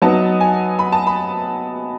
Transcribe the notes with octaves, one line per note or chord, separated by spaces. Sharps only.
F#3 B3 D#4 A5
G#5
B5
A5
B5